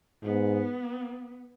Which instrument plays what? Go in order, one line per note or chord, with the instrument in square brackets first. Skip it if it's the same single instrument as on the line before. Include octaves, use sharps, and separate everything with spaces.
[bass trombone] G#2 [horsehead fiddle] B3